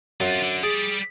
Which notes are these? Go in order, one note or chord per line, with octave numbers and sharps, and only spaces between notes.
F#2 C4 F4
D3
G3 G#4 D5